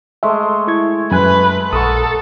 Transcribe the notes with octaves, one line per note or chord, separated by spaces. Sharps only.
G#3 A3 C5 E5
E4 C#6 G#6
F#2 B4 G#5 F#6
A#1 A4 A#4 F#5 C#6 D#6